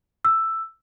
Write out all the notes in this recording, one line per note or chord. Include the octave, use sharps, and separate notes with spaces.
E6